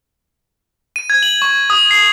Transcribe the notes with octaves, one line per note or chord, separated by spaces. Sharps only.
D#7
G#6
F#7
C#6
D#6
C7